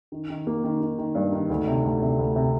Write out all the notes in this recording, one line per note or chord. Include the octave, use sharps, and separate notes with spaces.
D#3
D#3
A#3
D#3
D#3
D#3
G2
D#3
D2
C3
D2
C3
D2
C3